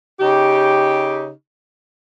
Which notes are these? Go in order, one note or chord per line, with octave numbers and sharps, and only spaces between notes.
C#3 D#4 G4